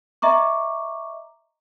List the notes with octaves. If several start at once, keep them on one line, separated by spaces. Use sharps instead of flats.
D#5 E5 A#5 C#6 D6